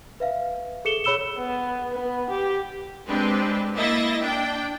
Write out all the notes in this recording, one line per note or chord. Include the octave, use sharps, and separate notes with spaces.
B4 E5 F5
G#4 A4 C#7 E7 G7
G#4 C#5 B5 E6 E7 G7
B3
B3
G4
G#3 C4 D4 G4 B4
A#3 E4 D#5 E5 A6 A#6
D4 G5